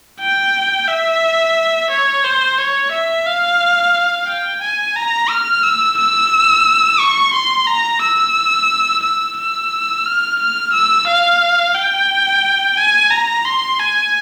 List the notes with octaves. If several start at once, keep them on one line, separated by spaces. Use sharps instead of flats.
G5
E5
C#5
C5
C#5
E5
F5
G5
G#5
A#5
F6
E6
E6
C#6
C6
A#5
E6
E6
E6
F6
F6
E6
F5
G5
G#5
A#5
C6
G#5